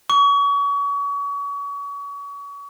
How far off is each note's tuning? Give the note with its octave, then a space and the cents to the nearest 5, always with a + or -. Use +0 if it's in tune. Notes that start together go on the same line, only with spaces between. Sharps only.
C#6 +35